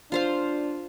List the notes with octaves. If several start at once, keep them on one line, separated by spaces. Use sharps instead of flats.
D4 F4 C5 F5